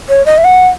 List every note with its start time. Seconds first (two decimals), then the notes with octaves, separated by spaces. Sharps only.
0.09 C#5
0.26 D#5
0.38 E5
0.44 F#5